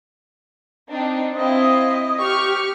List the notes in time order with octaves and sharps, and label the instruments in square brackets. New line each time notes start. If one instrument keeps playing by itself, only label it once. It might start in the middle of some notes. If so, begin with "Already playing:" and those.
[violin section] C4 D4 D#4
[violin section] C4 E4 F4 [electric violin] D#5
[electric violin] G4 [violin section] C#6 F6